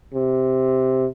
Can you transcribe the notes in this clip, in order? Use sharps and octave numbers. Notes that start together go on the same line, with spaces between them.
C3